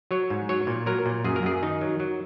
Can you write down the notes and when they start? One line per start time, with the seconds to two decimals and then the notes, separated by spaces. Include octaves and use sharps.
0.11 F#3 C#5
0.30 G#2
0.49 F#3 C#5
0.67 A#2
0.86 F#3 A#4
1.06 A#2
1.25 F#2 G#4
1.36 A#4
1.43 F#2 G#4
1.62 D#3 D#4
1.81 F#3
2.00 F#3